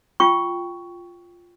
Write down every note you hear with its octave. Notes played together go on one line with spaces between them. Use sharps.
F4 G5 C#6